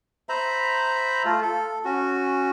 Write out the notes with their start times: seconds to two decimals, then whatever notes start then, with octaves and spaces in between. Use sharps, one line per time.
0.29 C5 E5 A#5 B5
1.25 A3 F4
1.42 A4
1.85 C#4 F#4